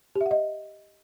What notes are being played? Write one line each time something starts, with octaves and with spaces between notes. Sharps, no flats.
G4
E5
F#5
D#5